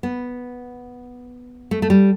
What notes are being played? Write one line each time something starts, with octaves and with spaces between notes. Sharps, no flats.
B3
A3
A3
G3